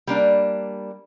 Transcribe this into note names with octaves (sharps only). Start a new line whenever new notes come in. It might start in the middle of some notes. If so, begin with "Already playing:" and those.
G3 A#3 D4